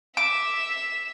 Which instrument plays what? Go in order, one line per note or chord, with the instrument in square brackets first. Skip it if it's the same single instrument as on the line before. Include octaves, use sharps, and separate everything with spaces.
[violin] E5 E7 [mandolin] D6